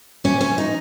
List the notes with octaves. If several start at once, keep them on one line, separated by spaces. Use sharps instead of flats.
C3 C#4
C#4
F3
D#4